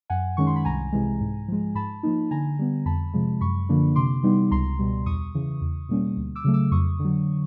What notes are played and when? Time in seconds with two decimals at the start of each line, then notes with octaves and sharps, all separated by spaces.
0.10 F#2 F#5 G#5
0.37 D#3 G#3 C#4 C#6
0.47 C6
0.56 B5
0.65 C2 G#5 A#5
0.93 C3 E3 G#3
1.20 G#2
1.48 F3 G#3
1.75 G#2 A5 B5
2.03 F3 A#3 D#4
2.31 D3 G#5 A#5
2.59 G3 B3
2.85 F2 A5 B5
3.13 C3 F3 G#3
3.41 F#2 B5 C#6
3.69 D3 F3 A#3 D4
3.95 C3 C6 D6
4.23 E3 G3 B3 D#4
4.51 C#2 A#5 C6
4.79 B2 G3
5.06 E2 C#6 D#6
5.35 C#3 E3
5.61 E2
5.89 B2 G3 A#3 C#4
6.17 D2
6.35 D6 E6
6.44 C#3 F#3 A3
6.54 D6 E6
6.71 F2 C#6 D#6
6.99 D3
7.05 F#3